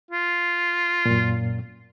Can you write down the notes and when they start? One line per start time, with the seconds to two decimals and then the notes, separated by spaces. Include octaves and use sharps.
0.11 F4
1.05 F#2 A#2